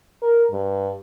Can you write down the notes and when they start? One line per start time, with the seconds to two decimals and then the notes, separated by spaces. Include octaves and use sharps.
0.22 A#4
0.52 G2